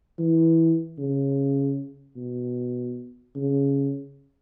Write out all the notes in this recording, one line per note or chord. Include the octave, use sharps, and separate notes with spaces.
E3
C#3
B2
C#3